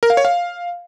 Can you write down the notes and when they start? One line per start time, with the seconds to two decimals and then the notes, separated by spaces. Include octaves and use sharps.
0.03 A#4
0.10 F5
0.17 C#5
0.25 F5